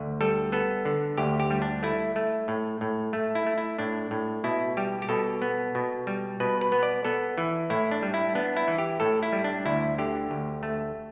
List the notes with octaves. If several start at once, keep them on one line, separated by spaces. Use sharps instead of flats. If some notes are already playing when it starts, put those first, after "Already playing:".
Already playing: D2 D3
G3 A4
B3 A4
D3
D2 G4
G4
G3
D4
A3 E4
A3
A2
A2
A3
E4
A3
E4
A2 D4
A2
B2 E4
G3 G4
G4
B2 A4
B3
B2
G3
B2 B4
B4
B3
D5
B3 A4
E3
A2 E4
D4
G3
E4
B3 D4
E4
E3
G4
A2 A4
E4
G3
D4
D2 E4
D3 G4
D2
A3